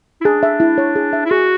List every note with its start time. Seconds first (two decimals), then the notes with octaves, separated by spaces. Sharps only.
0.21 E4
0.25 D4 G#4
0.43 E5
0.60 E4
0.78 C#5
0.96 G#4
1.13 E5
1.25 E4
1.31 F#4 G#4